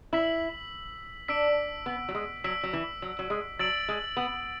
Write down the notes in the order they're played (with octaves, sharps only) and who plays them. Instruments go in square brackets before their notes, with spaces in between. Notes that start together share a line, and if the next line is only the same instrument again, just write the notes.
[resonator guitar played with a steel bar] E4 [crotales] E6 B6 F#7
[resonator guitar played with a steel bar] D4 [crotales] E6 B6 D7
[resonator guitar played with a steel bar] B3
F#3
G#3
[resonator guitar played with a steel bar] F#3 [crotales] E6 B6 D7
[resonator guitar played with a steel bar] F#3
E3
F#3
F#3
G#3
[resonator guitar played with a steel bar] F#3 [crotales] E6 A6 D7 F#7
[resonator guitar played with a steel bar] G#3
B3